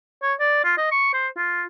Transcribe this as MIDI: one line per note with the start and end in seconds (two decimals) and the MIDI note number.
0.22 0.33 73
0.40 0.59 74
0.64 0.74 65
0.77 0.89 75
0.92 1.11 85
1.14 1.28 72
1.37 1.64 65